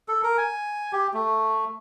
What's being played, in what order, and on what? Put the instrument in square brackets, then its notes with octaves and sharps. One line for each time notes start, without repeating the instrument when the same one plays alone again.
[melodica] A4
A#4
G#5
G4
A3